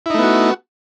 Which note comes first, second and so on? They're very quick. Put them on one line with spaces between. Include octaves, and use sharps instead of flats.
E4 D#4 A3 B3 F#4